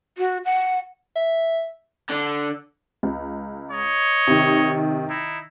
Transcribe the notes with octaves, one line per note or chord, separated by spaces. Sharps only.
F#4
F#5
E5
D3
C#2
C#5 D#5
C3 D#3
D#4 E4